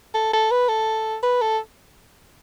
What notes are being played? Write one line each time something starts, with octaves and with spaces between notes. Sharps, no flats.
A4
A4
B4
A4
B4
A4